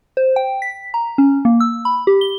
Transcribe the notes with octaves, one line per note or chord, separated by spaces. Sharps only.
C5
G5
B6
A#5
C#4
A#3
E6
B5
G4
G7